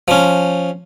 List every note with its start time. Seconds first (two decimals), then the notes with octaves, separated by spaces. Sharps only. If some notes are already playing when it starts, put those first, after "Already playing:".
0.08 F3 C#4